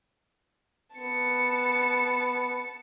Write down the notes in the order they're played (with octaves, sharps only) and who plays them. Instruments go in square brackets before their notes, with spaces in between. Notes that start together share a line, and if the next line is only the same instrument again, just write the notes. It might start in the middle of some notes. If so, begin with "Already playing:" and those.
[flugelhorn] B3 [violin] A5 C#7